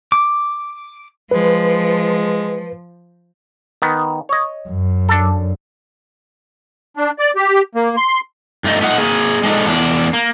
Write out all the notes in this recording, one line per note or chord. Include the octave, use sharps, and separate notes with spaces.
D6
F3 G#3 B4
D#3 B3
C#5 D#5
F#2
D4 A4
D4
D5
G4
A#3
C6
G2 A3 D#4
A3 D#4 F#5
A#3 G#4
G#3 D4 D#4 A4
E2 D4
A#3